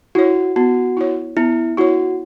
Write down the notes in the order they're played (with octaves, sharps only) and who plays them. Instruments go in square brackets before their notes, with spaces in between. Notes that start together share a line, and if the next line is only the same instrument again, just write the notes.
[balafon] E4 C#5 [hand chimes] F#4
[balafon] B3 [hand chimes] F#4
[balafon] E4 C#5
[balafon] B3 [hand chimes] E4
[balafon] E4 C#5 [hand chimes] F#4